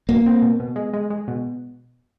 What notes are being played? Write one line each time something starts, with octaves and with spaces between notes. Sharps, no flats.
B2 A#3
C4
B2
B2
G#3
G#3
G#3
B2